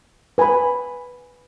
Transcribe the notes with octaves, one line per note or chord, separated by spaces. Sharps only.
B4 G#5 B5